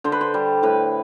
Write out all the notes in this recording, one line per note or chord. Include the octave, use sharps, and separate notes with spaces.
D3 C5
B4
C5
G3
A2 B4